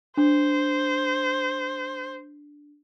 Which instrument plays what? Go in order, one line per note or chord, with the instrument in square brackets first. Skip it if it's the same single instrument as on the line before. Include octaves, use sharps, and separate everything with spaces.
[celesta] D4 [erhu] C5